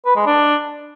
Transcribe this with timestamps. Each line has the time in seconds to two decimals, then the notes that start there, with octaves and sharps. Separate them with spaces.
0.06 B4
0.16 G#3
0.26 D4